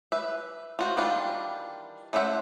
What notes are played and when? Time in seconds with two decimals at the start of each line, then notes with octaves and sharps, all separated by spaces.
0.12 B4 E5
0.79 F4 F#4 C5
0.97 D#3 E3 G3 D4 F4
2.13 A3 C#4 C5 E5 F#5